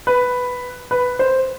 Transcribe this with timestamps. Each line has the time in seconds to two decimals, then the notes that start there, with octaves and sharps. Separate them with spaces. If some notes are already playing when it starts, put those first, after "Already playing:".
0.07 B4
0.91 B4
1.19 C5